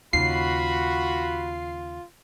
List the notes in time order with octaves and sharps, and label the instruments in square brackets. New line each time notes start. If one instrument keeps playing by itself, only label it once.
[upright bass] D#2 C#3 [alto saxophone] F4 [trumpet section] F#4 B5 [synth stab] C7